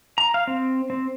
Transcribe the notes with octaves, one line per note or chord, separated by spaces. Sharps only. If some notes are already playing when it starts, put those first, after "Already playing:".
A#5
F5
C4
C4